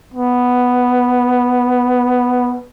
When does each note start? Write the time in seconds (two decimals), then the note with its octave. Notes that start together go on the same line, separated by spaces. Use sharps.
0.14 B3